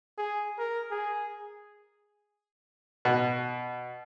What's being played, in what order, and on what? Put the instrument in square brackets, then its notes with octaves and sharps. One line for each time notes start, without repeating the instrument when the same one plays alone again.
[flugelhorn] G#4
A#4
G#4
[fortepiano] B2